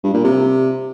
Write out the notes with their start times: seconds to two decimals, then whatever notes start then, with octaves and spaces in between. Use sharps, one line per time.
0.04 G2
0.14 A#2
0.24 C3